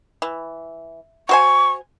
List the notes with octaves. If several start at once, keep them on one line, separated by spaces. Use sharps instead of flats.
E3
F#4 C5 G#5 C#6